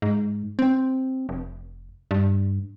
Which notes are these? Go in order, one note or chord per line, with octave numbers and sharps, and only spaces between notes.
G#2
C4
F1
G2